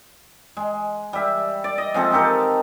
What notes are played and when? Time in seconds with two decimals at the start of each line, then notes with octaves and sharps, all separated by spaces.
0.57 G#3
1.13 G3 E5
1.64 D5
1.78 D#5
1.94 F3 G#3 C4 A4
2.12 D#4 G4 A4 A#4